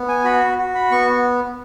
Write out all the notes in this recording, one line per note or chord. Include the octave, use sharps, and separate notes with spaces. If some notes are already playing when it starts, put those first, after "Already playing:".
Already playing: B3
G#5
F#4 B5
F#4
B5
B3 C#6